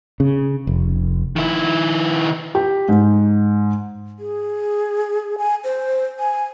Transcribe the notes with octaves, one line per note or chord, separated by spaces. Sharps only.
C#3
F1
D#3 E4
G4
G#2
G#4
G#5
C5
G#5